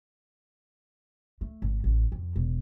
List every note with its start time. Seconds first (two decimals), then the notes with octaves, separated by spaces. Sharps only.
1.41 A3
1.62 G#1
1.84 A1
2.12 F2
2.36 E1